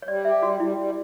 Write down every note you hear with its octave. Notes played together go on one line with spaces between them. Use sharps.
C#5
G3 D5
G4 E5
G3 F#4
G3 E4
G3